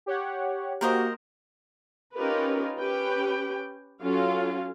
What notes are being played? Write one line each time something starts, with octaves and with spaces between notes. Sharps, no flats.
G4 C#5 F#5
A#3 F#4 G4 A#4 C5 D#5
C#4 D#4 F4 G4 A#4 B4
C#4 G4 B4 G5
F#3 C#4 F4 A4 F5